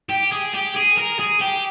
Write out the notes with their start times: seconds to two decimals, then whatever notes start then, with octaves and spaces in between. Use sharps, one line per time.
0.09 G4
0.32 G#4
0.54 G4
0.75 G#4
0.98 A#4
1.19 G#4
1.42 G4